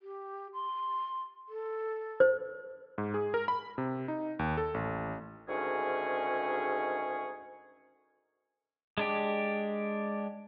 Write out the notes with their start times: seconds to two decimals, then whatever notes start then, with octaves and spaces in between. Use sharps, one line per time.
0.02 G4
0.54 C6
1.49 A4
2.20 C5
2.98 G#2
3.14 G#4
3.34 A#4
3.48 B5
3.78 C3
4.08 D#4
4.39 D#2
4.57 A4
4.74 A1
5.48 D2 G#2 D#3 C#4 G#4 C#6
8.98 G#3 D4 G4